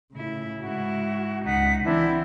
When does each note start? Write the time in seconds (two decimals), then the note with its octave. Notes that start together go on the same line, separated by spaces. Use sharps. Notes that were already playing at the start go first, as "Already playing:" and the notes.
0.14 A2 C#3 E4
0.59 G#2 E4 F#4
1.46 C#2 D#4 F#5 B6
1.85 E3 C4 D4 E4